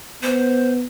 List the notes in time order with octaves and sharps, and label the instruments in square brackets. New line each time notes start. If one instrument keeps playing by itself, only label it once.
[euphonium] B3 [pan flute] C5